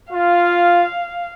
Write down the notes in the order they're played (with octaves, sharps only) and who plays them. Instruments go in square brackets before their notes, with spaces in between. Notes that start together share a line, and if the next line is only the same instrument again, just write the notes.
[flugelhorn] F4 [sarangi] F5